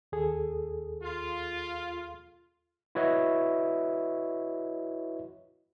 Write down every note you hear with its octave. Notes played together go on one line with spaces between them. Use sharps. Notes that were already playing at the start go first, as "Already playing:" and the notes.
D#2 G#4 A4
F4
E4 F#4 B4 C#5 D#5 E5